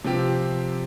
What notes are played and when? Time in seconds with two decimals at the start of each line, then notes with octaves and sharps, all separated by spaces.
0.05 C3 F3 C4 G4